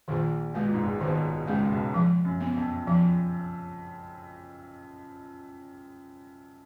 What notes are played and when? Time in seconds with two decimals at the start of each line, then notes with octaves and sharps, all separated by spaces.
0.08 A#1 A#2 D#3
0.54 B2 G#3
0.65 A#2
0.74 G#2
0.83 A#1 A#2
1.01 B1 B2 D#3
1.47 C#2 C#3 G#3
1.70 B1 B2
1.94 F3
2.25 F#2
2.41 B3
2.55 F2
2.87 F3